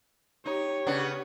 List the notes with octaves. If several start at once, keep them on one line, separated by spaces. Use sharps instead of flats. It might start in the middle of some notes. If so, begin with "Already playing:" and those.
D#4 G4 C#5
C#3 B3 D4